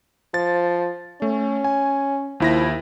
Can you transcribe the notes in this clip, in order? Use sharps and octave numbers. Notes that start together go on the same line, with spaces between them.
F3 A6
A3 C#4
G#5
D#2 F3 E4 A#6